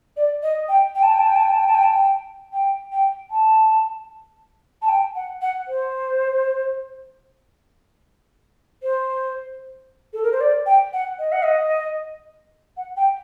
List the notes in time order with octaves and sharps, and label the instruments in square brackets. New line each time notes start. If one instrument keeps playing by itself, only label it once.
[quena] D5
D#5
G5
G5
A5
G5
A5
G5
A5
G5
A5
G5
A5
G5
A5
G5
G5
G5
A5
A5
G5
F#5
F#5
C5
C5
A4
A#4
C5
D5
G5
F#5
D#5
F#5
D#5
F#5
G5